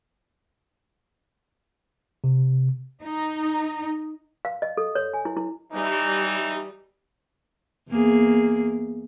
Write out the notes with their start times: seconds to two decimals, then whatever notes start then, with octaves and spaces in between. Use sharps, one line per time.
2.24 C3
3.02 D#4
4.45 F5
4.62 D#5
4.77 A4
4.95 C#5
5.14 G#5
5.25 E4
5.37 E4
5.73 E3 G3 D#4
7.89 E2 A#3 G#4